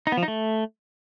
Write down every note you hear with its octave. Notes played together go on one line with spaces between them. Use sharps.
D#4
B3
F3
D#4
A3